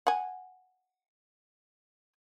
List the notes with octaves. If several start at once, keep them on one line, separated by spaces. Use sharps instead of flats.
F#5 G#5